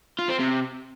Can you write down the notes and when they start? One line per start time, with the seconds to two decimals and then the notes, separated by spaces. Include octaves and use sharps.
0.19 F4
0.29 C4
0.40 C3